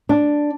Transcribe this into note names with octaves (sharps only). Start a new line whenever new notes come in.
D4